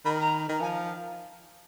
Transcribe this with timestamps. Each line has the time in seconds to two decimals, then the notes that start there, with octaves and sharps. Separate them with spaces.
0.05 D#3 B5
0.19 A#5
0.49 D#3
0.61 F3 G#5